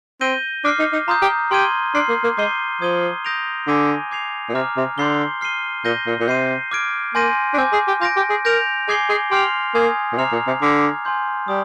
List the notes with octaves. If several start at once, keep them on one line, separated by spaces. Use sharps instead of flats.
C4 G6 A#6 D#7 G7
D4 D6 F6 C7
D#4
D#4
F4 A#5 D#6 G6
G4
G4 C6 F6 G#6 D#7 G7
D4 C6 F6 C7
A#3
A#3
G#3 D6 G6 C7 D#7 G7
F3 D#6 G#6 D#7 G7
D#6 G6 A#6 D7 F7
D3 G#5 D6 G#6 D#7 G7
D6 G#6 C7 F7
A#2
C3 A#5 D6 F6
C3
D3 C6 G6 C7 G7
F6 C7 D#7 G7
A#2 G6 A#6 D#7 G7
A#2
A#2
C3 G6 C7 D#7
D6 F6 G#6 D7
A#3 G#5 C6 G6 A#6 D#7
D4
C4 G#5 D6 G6
G#4
G4
F4 G6 A#6 D7
G4
G#4
A#4 G6 A#6 D7 F7
G#4 G#5 D6 G#6 C7 G7
G#4
G4 C6 F6 C7 F7
A#3 G#5 D#6 G#6
A#2
C3 A#5 D6 F6 C7 F7
A#2
C3
D3 D6 F6 G#6
G#5 C6 G6
G3 D#6